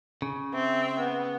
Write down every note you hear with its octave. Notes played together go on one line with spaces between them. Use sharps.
C#3
C4 E5
B3